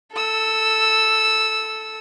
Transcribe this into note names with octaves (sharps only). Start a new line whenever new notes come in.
A4 E6